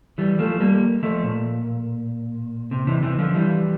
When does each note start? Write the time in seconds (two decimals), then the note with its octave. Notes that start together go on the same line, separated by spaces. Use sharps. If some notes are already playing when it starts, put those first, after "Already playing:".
0.18 E3 G3
0.39 F3 A3
0.60 G3 A#3
1.03 F3 A3
1.24 A#2
2.71 C3
2.87 C3 E3
3.03 C3 E3
3.19 D3 F3
3.34 E3 G3